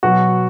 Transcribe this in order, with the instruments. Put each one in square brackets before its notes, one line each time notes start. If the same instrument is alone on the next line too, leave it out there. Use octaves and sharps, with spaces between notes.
[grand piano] B2 F#3 F#4